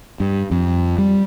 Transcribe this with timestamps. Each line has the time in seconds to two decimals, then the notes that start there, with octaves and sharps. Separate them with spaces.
0.20 G2
0.51 F2
0.98 G3